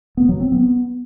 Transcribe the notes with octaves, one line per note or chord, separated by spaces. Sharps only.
B3
F#3
C4
B3